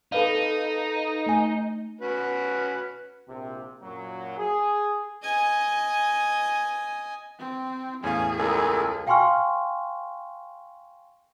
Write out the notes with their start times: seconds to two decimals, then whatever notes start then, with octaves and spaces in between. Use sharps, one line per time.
0.12 D#4 A4 B4 F5
1.26 A3 G#5
2.01 C#4 F#4 B4
3.28 A#1 C3
3.82 F#2 A#2 F#3
4.38 G#4
5.23 D#5 G#5
7.39 C4
8.04 E2 A2 C#4 G#4 F5 G#5
8.38 C#2 A4 A#4
9.07 F5 G5 G#5 C6 C#6 F6